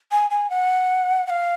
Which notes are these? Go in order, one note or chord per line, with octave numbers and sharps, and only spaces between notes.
G#5
G#5
F#5
F#5
F5